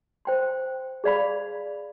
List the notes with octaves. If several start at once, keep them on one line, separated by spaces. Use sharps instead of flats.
C5 G5 C6
G#4 D5 F5 B5